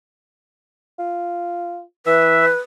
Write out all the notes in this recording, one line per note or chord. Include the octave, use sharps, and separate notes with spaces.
F4
E3 B4 E5